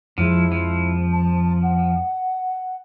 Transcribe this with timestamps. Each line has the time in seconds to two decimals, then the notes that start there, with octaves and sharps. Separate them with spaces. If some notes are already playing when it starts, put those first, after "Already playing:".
0.18 F2 F3 G#3 E4
0.52 F3
1.12 A5
1.62 F#5